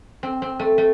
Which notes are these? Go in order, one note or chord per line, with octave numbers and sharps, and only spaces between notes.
C4
C4
A3
A3